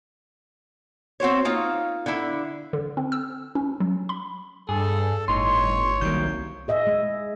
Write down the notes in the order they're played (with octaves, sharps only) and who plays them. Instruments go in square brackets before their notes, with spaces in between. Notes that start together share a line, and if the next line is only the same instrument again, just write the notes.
[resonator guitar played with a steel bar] C4 F#4 C5 C#5
A#3 D#4 F4
D3 E4
[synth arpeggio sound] D3
C4
E6
C#4
F#3
B5
[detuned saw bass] G2 [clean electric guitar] G#4 [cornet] A4
[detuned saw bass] G1 [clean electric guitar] A2 D#4 [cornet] C#5 [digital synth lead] C6
[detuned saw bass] C2 [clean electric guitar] D#3 F#3 A#3 [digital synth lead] G6
[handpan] G#4 D#5 E5
G#3